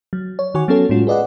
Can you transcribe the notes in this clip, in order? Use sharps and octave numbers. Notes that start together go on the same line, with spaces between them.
F#3
C#5
D#3 F#4 G#5 C#6
F#3 B3 C#4 F#4 A4 C#5
A2 G#3 C#4 F4 F#4
G#4 B4 D5 D#5 F#5